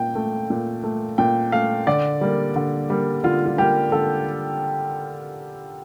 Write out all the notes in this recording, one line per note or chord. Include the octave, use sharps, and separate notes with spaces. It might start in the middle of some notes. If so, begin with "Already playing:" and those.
Already playing: A#2 G5
A3
A#2
A3
A#2 G5
A3 F5
D3 D5
G3 A#3
D3
G3 A#3
D3 F4
F4
G3 A#3 G4
D3 A4